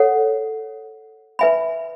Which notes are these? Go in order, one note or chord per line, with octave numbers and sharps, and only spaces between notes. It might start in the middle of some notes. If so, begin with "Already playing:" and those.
Already playing: A4 C#5 F#5
B4 E5 G#5 B5